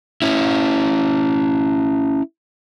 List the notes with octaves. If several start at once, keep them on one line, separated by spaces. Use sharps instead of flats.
C#4 E4